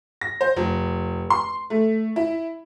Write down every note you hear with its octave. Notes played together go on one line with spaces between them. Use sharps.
A#6
C5
F1
C6
A3
E4